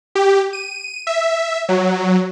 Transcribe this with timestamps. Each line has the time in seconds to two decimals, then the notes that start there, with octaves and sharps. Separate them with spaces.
0.15 G4
0.53 D#7
1.07 E5
1.69 F#3